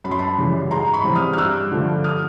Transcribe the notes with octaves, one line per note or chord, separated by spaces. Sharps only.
F#2 B5
C6
A5 B5
C#3 E3 G3
G#2 A#5 C6
B5 C#6
E3 G3 C4
D#6 F6
F6
G2 E6 F#6
D3 F3 A3
D#6 F6